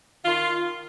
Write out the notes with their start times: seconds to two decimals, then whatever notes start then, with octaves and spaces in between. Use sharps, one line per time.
0.25 D#3 F4